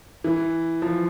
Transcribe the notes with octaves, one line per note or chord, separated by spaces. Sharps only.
E3
F3